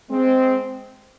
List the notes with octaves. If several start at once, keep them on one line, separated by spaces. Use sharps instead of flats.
G#3 C4